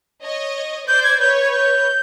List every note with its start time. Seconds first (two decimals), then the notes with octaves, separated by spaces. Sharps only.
0.23 C#5 D#5
0.88 C5 D5 G6
1.04 G#6
1.20 B4 C#5 G6
1.41 G#6
1.53 G6